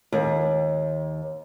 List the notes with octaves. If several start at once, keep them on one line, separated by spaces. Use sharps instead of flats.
D#2